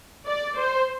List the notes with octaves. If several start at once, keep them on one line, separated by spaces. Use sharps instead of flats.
D5
C5